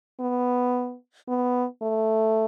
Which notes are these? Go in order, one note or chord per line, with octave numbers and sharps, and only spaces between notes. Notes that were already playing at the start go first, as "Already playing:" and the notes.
B3
B3
A3